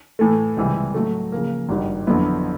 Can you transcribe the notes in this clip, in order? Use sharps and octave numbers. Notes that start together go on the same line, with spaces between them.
A2 E3 A3
C#2 C3 E3 G3
A2 F#3 A3
C#3 F3 A#3
G#1 G2 D#3 G3
F2 D3 F#3 B3 E4